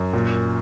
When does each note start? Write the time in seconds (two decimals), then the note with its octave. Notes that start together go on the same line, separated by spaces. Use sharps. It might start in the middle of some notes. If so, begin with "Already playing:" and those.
Already playing: F#2
0.13 A#2